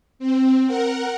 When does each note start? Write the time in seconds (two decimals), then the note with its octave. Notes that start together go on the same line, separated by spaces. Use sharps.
0.19 C4
0.66 A#4 F#5